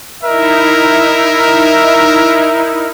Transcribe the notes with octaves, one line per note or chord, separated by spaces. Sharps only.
D#4 E4 A#4 E5